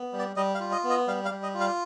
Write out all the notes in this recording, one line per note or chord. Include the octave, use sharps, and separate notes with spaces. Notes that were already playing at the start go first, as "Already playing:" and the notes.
Already playing: B3
G3
D5
G3 D#5
F5
F4
D#5
B3
D#5
G3 F5
F5
G3
D#5
F4
F5